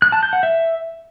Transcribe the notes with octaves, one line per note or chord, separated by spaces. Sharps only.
F#6
A5
G6
F#5
E5